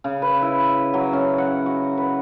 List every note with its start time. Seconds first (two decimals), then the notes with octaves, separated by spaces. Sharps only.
0.04 C#3
0.22 B4
0.42 E4
0.94 F#3
1.13 C#4
1.38 F#5
1.66 F#4
1.98 B4